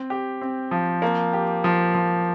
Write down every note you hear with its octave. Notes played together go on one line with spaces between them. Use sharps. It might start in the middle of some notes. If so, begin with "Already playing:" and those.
Already playing: C4
G4
C4
F3
A#3
G4
F3
F3